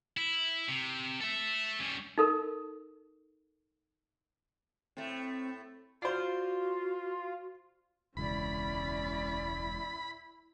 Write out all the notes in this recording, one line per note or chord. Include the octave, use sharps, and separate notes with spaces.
E4
C3
A4 E5
G3 C#4
D#4 A4 A#4
A2 A3 C4
F4 F#4 C5 D5
E1 C#2 C#4 E4 D5 B5